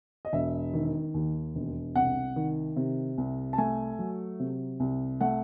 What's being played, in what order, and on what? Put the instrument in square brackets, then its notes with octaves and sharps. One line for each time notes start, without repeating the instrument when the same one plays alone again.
[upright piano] D#5
E1 E5
D#3
D#2
E1
C2 F#5
D#3
C3
C2
A5
A3 G#5
F#3
C3
C2
A3 F#5